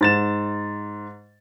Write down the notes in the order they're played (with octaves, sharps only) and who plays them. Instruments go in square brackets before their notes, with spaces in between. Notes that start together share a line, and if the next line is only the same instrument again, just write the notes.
[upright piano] G#2 A6 E7